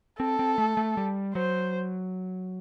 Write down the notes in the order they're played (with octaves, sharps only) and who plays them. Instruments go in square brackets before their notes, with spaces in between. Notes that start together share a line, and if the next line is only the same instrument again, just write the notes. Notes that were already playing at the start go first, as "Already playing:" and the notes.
[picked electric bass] C4 [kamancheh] A4
[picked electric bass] C4
A3
A3
G3
[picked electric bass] F#3 [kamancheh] C5